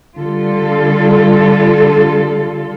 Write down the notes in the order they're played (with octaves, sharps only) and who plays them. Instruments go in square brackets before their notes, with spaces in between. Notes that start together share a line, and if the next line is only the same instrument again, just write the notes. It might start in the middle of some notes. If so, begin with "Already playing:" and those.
[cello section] D3 G3 F4 A4